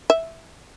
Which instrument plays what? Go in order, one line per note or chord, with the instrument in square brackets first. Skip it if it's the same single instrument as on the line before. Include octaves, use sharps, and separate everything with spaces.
[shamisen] E5